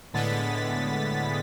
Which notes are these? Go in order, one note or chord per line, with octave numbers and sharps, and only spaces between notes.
A2 D3 G#3 B3 A6 B6